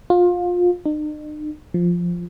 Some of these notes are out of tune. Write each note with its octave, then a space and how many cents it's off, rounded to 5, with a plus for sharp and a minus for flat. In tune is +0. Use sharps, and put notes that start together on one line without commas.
F4 +25
D#4 -45
F3 +0